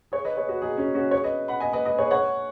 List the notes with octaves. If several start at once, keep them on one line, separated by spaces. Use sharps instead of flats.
G#4 C#5
B4 D#5
G#4 C#5
F#4 B4
D#4 G#4
C#4 F#4
C#4 F#4
G#4 C#5
B4 D#5
F#5 B5
D#5 G#5
B4 D#5
B4 D#5
G#4 C#5
C#5 F#5